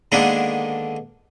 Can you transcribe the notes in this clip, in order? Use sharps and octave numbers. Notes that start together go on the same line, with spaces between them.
D3 D#3 G#3 A#3 B3 D4